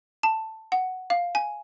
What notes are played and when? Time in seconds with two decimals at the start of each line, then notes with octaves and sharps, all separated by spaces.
0.23 A5
0.72 F#5
1.10 F5
1.35 G#5